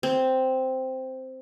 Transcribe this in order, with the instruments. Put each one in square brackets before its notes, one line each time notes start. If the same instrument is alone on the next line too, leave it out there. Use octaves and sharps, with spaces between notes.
[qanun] C4